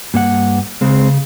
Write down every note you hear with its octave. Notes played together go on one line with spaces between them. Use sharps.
G2 A#3 F#5
C#3 G#3 C4